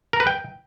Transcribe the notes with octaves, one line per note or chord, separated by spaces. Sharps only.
A#4
B4
G5